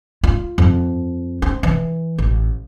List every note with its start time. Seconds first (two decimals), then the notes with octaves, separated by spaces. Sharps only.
0.24 F4
0.58 F2
1.42 C4
1.63 E3
2.18 A1